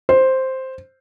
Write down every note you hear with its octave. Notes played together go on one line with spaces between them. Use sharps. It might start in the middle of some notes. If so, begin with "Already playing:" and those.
C5